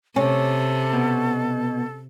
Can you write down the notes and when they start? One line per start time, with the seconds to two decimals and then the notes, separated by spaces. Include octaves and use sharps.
0.16 C3 C#4 A4
0.93 B2